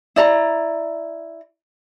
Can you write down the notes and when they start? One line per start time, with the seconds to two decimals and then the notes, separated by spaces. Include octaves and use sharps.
0.16 E4 D5 A#5